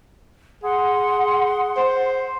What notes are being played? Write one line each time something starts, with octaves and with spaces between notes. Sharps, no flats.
G#4 F#5 C6
C5